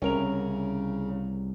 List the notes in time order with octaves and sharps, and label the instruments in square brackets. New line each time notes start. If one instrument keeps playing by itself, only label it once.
[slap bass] C2 [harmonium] C#3 [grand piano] C#4 A#4 F7